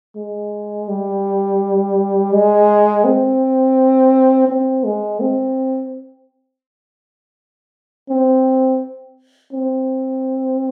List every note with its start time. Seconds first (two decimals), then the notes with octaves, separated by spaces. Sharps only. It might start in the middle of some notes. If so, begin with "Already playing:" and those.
0.16 G#3
0.89 G3
2.32 G#3
3.04 C4
4.49 C4
4.84 G#3
5.20 C4
8.09 C4
9.53 C4